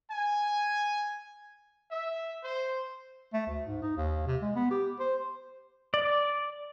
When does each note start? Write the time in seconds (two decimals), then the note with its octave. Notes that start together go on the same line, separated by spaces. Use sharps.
0.12 G#5
1.92 E5
2.44 C5
3.33 A3
3.47 D2
3.65 G#2
3.82 D#4
3.97 D#2
4.27 C3
4.42 G#3
4.56 B3
4.70 G4
5.00 C5
5.94 D5